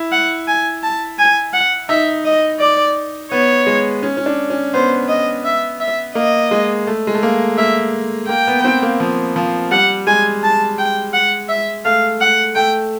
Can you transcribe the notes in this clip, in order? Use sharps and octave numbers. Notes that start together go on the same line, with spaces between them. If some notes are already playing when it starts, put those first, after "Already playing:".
Already playing: E4
F#5
G#5
A5
G#5
F#5
D#4 E5
D#5
D5
B3 C#5
G#3
C#4
C#4
D4
C#4
B3 C5
D#5
E5
E5
A#3 D#5
G#3
A3
G#3
A3
A#3
A#3 E5
A#3 G5
B3
B3
C4
A#3
F3
F3
G3 F#5
G#3 G#5
A5
G5
F#5
E5
A3 F5
F#5
A3 G5